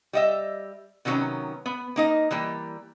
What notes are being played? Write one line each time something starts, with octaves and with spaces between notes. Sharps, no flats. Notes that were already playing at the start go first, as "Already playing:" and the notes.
G3 D#5 E5
C3 D#3 F#3 G3 B3 C#4
B3
A#3 D#4 D#5
E3 G3 A#3